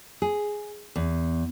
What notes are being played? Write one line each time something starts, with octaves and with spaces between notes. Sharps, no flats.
G#4
E2